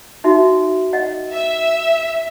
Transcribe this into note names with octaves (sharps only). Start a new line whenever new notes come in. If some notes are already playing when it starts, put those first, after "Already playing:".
D#4 F#4 E5
D#5 F#5
E5